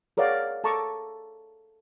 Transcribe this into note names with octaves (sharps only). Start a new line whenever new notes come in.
G#4 A#4 C#5 D5 F5 F#5
A4 A5 A#5 C#6 D6